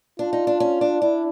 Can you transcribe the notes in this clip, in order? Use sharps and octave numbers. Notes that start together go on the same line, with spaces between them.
D4 F4
D#4
D4
C#4
D4
D4 E4